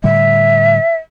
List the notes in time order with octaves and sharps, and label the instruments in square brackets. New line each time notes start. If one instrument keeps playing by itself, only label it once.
[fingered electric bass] A2 D3 G3 [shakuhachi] E5